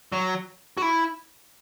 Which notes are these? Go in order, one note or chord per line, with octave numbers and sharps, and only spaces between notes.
F#3
F#4
E4